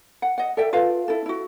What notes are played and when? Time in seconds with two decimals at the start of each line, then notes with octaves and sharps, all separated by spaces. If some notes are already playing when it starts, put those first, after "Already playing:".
0.22 F#5
0.38 D#5 F#5
0.57 A4 D5 E5 G5
0.73 F4 A4 B4 F5
1.08 E4 A4
1.26 E4 F#4